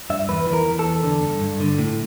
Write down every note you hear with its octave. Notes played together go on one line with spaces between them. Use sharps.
G2 E5
E2 B4
E3
A#4
E3
A4
E2
D3
G2
G2
D3
A2